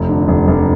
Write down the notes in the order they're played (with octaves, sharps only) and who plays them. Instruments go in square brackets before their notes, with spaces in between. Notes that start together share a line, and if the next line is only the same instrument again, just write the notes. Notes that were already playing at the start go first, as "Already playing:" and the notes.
Already playing: [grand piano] F1
D3
F1
F1